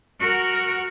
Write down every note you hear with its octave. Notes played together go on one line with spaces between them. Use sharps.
F#4 A#4